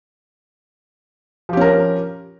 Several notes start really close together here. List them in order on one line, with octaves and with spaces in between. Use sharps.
F3 G4 C#4 A#4